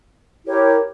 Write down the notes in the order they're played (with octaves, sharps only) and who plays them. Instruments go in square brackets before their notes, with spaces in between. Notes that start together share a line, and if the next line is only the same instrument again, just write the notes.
[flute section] E4 G4 A#4 C#5